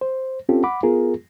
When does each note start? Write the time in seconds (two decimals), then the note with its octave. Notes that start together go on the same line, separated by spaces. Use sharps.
0.01 C5
0.49 C4 C#4 F4 G4 A4
0.63 F#5 B5 D6
0.83 B3 F4 G#4 A#4